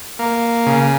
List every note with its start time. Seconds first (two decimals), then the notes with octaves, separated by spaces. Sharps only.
0.19 A#3
0.66 C#3